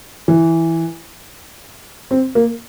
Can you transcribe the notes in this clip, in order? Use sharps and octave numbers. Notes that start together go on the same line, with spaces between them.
E3
C4
A#3